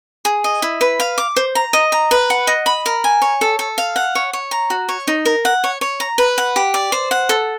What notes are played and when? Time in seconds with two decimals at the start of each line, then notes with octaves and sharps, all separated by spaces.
0.25 G#4
0.44 D#5
0.62 E4
0.81 B4
1.00 F5
1.18 D6
1.36 C5
1.55 A#5
1.73 D#5
1.92 A#5
2.11 B4
2.30 F#5
2.47 D#5
2.66 B5
2.86 A#4
3.04 G#5
3.22 C#5
3.41 A4
3.59 A4
3.78 F5
3.96 F#5
4.15 C#5
4.33 C#5
4.51 A#5
4.70 F#4
4.89 C#5
5.07 D#4
5.25 A#4
5.45 F#5
5.64 C#5
5.81 C#5
6.00 A#5
6.18 B4
6.38 F#5
6.56 G4
6.74 D5
6.92 C5
7.11 F#5
7.29 A4